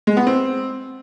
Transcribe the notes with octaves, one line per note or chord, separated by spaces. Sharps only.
G#3
B3
C4